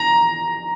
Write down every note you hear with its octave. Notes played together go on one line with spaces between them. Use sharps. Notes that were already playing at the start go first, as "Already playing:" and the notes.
Already playing: A#5